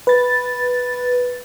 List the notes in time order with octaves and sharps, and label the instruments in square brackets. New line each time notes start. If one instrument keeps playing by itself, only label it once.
[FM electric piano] B4 A6